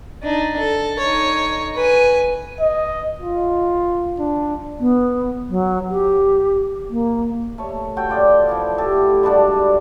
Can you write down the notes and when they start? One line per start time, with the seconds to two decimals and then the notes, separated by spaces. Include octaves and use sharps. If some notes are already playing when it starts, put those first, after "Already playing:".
0.23 D4 D#4
0.59 A4
0.99 D#4 C#5
1.75 B4 G#5
2.61 D#5
3.20 F4
4.19 D4
4.80 B3
5.49 F#3
5.90 G4
6.90 A#3
7.58 A3 C#5
7.97 F#4 A4 C#5 G5
8.09 F4 D5 D#5
8.49 E3 F3
8.78 A3 G4 A4
9.23 G3 G#3 D4 F#4